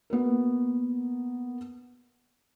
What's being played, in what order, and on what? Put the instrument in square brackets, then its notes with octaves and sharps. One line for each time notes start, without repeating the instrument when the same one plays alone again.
[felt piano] A#3 B3 F#4 A#4